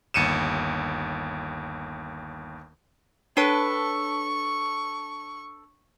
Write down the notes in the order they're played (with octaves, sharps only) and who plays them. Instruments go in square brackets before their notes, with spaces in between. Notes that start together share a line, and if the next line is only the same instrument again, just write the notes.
[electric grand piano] G1 D#2 C#7 D#7 E7
[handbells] D4 C#5 A5 [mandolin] A4 B4 [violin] C#6